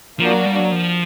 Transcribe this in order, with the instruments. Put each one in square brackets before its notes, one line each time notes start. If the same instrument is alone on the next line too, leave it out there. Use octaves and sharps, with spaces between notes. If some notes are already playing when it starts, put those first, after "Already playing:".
[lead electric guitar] F3 [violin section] A#3 D4 F#4 A#4 D5
[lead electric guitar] F#3
G3
F#3
F3